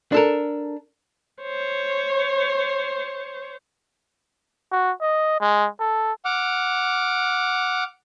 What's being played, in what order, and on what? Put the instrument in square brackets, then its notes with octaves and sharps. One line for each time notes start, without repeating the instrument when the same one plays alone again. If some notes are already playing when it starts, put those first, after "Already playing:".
[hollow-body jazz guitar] D4 A4 A#4
[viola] C5 C#5
[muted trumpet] F#4
D#5
G#3
A4
[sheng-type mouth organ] F#5 D6 F6